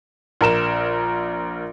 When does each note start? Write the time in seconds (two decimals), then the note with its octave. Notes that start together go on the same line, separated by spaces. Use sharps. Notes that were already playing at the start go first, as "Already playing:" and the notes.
0.41 A#1 A#4 E7